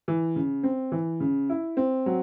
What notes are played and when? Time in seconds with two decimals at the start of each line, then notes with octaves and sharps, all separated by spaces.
0.08 E3
0.36 C#3
0.63 C4
0.92 E3
1.20 C#3
1.50 E4
1.77 C4
2.06 F#3